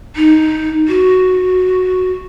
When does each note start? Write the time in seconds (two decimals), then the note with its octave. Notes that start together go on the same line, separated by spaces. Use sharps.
0.16 D#4
0.88 F#4